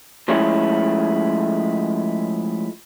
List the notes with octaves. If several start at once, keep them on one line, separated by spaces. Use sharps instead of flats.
F3 G#3 A3 C#4 E4